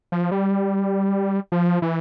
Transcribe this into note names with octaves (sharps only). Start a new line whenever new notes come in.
F3
G3
F3
E3